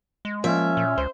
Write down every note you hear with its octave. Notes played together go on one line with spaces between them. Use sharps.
G#3
F3 A#3 C#4 E5
A#2
C#2 C5